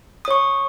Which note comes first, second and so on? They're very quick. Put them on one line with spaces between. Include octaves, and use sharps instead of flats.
D#6 C#5 C#6